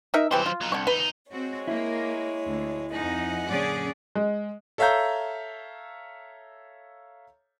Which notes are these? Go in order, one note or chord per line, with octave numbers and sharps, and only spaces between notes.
D#4 A#4 E5
E3 F#3 G3 C4 C5
F4
F#3 D#4
C2 D3 C#6
E2 D#4 B4
G#3 C4 F#4 C#5
A#3 E4
D2
F2 D#4 F#5 G#5
F#2 A#2 D3 C#4 G#4 D5
G#3
A4 C#5 E5 F5 A#5 G6